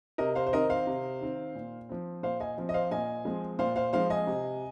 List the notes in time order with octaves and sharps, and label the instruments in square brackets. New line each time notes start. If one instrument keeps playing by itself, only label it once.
[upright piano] C3 A#4 D#5
C5 F5
C5
D#3 C4 A#4 D#5
C5 F5
C3
D#3 C4
A#2
F3 C4
A#2 C5 F5
D#5 G#5
F3 C4
D#5
C5 F5
A#2 D#5 G#5
F3 G#3 C4
A#2 C5 F5
C5 F5
F3 G#3 C4 C5 F5
D#5 G#5
C3